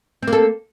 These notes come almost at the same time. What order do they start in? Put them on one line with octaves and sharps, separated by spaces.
C4 A#3 A4